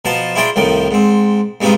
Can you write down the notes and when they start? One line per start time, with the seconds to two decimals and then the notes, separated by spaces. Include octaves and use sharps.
0.05 B2 F3 F5 A5 A#5
0.36 E4 F4 G#4 D5 G5 A#5
0.56 C2 A2 D#3 F3 G5
0.91 G#2 C4
1.61 G2 G#3 B3 C4 D#4 F4